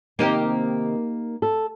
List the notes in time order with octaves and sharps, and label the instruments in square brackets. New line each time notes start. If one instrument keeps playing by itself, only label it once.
[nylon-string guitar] C3 D#3 C4 [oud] A#3 D#4 G4
[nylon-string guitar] A4